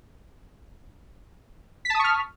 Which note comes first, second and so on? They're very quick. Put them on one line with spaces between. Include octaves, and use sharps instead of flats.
B6 A5 D#6 C#6 F6